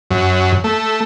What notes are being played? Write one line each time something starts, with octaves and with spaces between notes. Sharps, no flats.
F#2
A3